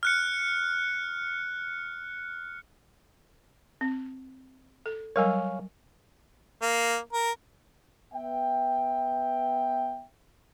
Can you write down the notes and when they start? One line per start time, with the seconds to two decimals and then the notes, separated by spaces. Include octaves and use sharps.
0.03 F6 F#6 C#7
3.81 C4
4.86 A4
5.16 F#3 G3 A#4 C#5 F5 G#5
6.62 A#3
7.13 A#4
8.14 B3 E5 G5